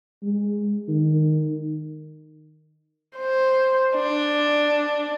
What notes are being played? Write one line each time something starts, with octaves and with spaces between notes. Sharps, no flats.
G#3
D#3
C5
D4